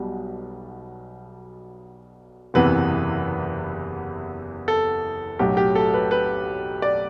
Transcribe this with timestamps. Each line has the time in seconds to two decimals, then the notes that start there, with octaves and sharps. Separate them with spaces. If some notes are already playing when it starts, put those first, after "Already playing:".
Already playing: B1 B2 G3
2.54 F#1 E2 C3 E3 B3 B4
4.68 A4
5.39 B1 A2 F#3 G4
5.57 G4
5.75 A4
5.94 B4
6.11 B4
6.82 D5